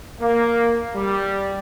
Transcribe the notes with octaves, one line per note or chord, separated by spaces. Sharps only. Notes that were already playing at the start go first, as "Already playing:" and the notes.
A#3
G3